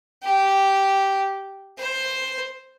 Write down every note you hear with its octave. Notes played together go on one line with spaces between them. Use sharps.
G4
C5